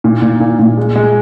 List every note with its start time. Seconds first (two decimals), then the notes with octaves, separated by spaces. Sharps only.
0.04 A#2
0.22 A#2
0.40 A#2
0.59 A#2
0.77 G#3
0.96 G#3